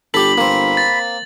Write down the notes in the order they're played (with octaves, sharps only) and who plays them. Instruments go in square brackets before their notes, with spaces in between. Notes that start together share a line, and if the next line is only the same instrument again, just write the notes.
[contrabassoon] G1 [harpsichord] G4 A4 [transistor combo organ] B5 [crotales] F#7
[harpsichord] A#3 C4
[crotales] A6